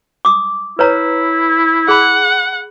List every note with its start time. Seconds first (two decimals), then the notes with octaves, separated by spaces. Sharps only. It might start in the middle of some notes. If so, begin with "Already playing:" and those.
0.25 D6 D#6
0.79 E4 B4 C#5 A#5
1.88 G#4 F#5 B5